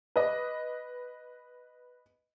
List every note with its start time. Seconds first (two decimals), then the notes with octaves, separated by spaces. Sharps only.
0.16 B4 D#5 D6